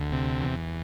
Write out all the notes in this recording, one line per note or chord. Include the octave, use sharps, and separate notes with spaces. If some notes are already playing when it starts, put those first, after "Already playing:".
Already playing: D2
C3
E2